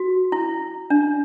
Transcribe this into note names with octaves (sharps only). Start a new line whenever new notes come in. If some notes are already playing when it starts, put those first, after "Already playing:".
Already playing: F#4
E4
D4